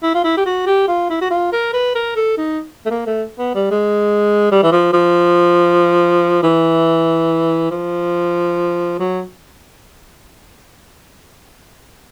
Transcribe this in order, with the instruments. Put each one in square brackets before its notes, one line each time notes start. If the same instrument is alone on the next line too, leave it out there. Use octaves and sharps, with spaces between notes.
[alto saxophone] E4
F4
E4
G4
F#4
G4
F4
E4
F#4
F4
A#4
B4
A#4
A4
D#4
A3
A#3
A3
B3
G3
G#3
G3
E3
F3
F3
E3
F3
F#3